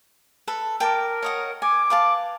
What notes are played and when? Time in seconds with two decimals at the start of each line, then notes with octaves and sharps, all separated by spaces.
0.47 A4 B4
0.80 A#4 G5 A5 D6
1.23 C#5 D#5 F#5
1.62 G#5 D6
1.90 B4 F5 A5